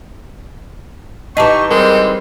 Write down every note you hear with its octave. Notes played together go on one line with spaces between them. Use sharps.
E3 D#4 G4 D#5 A5 C#6
G3 G#3 C4 A#4